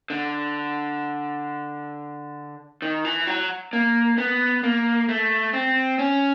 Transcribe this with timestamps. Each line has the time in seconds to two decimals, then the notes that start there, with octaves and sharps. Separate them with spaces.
0.10 D3
2.82 D#3
3.05 E3
3.27 F#3
3.73 A#3
4.18 B3
4.63 A#3
5.09 A3
5.53 C4
5.99 C#4